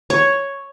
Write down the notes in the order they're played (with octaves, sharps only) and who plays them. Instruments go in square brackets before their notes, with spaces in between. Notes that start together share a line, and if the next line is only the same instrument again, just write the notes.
[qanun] C#5